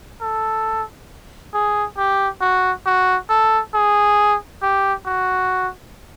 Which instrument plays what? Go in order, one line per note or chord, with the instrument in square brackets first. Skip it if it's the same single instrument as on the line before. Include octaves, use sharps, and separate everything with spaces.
[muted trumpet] A4
G#4
G4
F#4
F#4
A4
G#4
G4
F#4